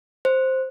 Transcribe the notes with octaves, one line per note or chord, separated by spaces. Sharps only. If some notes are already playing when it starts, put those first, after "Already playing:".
C5